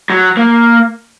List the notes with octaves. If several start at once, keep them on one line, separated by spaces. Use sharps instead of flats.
F#3
A#3